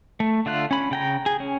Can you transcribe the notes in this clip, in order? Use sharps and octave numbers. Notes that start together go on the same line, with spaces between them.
A3
D3 A3 F4 F#6
C#4 B5
C#3 G5 A#5
G#4
C#4